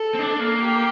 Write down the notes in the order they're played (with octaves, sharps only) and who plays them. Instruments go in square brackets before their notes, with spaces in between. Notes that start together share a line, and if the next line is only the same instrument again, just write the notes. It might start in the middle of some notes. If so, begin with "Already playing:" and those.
Already playing: [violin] A4
[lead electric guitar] C4
D4
A#3
[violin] G4